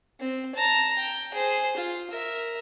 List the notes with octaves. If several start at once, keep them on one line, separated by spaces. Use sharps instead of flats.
C4
A5 A#5
G5
G#4 C5
F4
A#4 E5